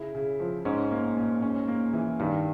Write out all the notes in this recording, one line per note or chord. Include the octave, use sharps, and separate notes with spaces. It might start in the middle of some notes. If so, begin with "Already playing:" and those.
Already playing: C#3 E4
C#3
F3
G#2 C#4
A#3
A#2
C#4
A#3
E3
G2 D#3